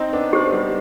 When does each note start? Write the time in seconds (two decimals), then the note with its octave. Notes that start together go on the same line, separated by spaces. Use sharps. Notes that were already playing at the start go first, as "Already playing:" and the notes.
Already playing: C4 D#4
0.13 B3 D4
0.33 G4 C5
0.52 G3 B3